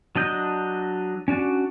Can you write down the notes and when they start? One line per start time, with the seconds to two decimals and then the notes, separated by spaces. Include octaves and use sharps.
0.16 F#3 D4 D#5 G6
1.28 C#4 D4 F#4 D5